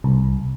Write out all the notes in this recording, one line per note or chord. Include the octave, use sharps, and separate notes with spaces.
C2